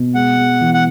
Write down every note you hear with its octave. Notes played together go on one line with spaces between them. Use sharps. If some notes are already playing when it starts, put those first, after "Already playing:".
Already playing: B2
G#3 F#5
G#3
E3
F#5